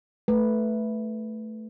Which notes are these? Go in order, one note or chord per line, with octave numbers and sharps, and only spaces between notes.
A3 B4